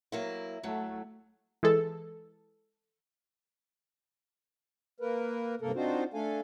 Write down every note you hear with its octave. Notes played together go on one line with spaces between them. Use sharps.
F#3 A#3 E4
A2 F#3 A3
E3 G#3 A4
A#3 A#4 B4
G2 C3 A#3 A4 A#4
C4 D4 D#4 F4 F#4 C5
A3 D4 A4 F5 G#5